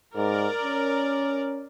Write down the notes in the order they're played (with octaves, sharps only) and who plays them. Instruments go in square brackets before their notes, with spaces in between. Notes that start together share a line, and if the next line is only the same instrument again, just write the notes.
[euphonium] G#2 [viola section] A#4 D5
[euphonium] C#4